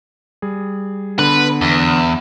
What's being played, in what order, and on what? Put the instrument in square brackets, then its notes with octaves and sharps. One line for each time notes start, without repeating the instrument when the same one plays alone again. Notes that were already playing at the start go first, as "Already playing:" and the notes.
[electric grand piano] G3 G#4
[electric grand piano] D3 B3 [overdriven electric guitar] B4
[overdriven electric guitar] E2